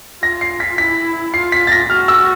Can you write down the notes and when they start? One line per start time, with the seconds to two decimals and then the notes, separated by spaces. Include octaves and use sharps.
0.22 F4 A#6
0.41 C7
0.60 B6
0.78 E4 B6
1.34 F4 C7
1.52 B6
1.67 A6
1.72 A#6
1.90 F#4 F6
2.08 E6